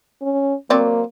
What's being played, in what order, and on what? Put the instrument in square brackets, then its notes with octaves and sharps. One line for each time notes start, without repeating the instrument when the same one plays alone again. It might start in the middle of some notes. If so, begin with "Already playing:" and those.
[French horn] C#4
[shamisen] F#3 C4 D5 [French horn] A#3